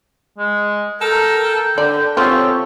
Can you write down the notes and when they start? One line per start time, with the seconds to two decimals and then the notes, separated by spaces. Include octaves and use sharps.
0.38 G#3
1.02 A4 A#4 G5
1.78 D3 D5
2.17 C#3 B3 C4 F4 G4 A4 C#5